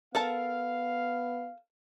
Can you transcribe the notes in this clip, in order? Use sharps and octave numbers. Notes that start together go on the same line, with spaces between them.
B3 A4 A#4 F5 A5